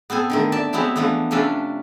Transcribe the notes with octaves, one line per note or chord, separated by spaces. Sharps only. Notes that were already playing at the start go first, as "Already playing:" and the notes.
B3 C4 A4 G#5
D3 D#3 A3
D5 E5 A5
F#3 G#3 B3 C4 E4 G4
E3 F3 A3 B3 D4
C3 F3 C#4 D4 A4 B4